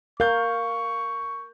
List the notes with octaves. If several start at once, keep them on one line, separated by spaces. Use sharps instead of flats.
A#4 F5 C#6 G6